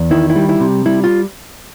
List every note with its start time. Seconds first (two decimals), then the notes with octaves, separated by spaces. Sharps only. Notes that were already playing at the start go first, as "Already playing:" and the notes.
Already playing: E2
0.11 D#3 E4
0.30 E4
0.36 G3
0.49 E4
0.60 C3
0.86 G3 E4
1.04 F4